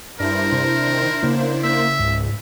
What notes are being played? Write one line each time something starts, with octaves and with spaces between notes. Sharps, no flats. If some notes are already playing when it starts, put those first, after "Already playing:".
G2 D4 E4 A#4 C5
C3
D#3
C#3 A#3 B3 C#4
A#3 E5
C#2 G#2